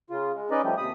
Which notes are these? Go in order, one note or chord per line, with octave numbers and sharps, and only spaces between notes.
C#3 F4
G#3
C#4 D#4 B4 D5 D#5
F3 G3 A3 G4
D#2 C3 B5 D#6